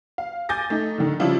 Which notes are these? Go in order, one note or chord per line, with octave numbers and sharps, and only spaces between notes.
F5
G#5 D6 G6 A6 A#6
A3 D#4
D3 D#3
C#3 F3 G3 D4 E4 F4